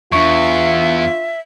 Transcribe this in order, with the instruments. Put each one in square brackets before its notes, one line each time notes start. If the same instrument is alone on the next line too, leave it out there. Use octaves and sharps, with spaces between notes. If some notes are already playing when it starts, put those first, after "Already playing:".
[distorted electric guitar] E2 [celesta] D4 C#6 [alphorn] F4 [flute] E5